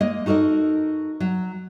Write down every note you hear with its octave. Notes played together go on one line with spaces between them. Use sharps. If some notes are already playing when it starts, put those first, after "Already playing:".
G#3 A#3 D#5
D#4 F#4 A4 A#4 D#5
F#3